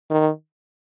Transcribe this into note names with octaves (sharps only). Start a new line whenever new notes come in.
D#3